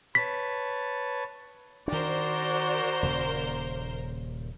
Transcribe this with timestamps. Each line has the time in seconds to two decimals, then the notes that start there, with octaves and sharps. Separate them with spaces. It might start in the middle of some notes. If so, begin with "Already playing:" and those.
0.15 B4 C#5 A5 B6
1.88 D#3 D4 F#4 A#4 C5 D5
3.03 D#1 C#3 A#3